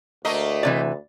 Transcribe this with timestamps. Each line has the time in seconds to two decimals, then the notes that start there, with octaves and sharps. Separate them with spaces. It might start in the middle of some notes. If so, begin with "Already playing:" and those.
0.25 D2 A3 A#3 D#5
0.63 A2 C3 E3 D5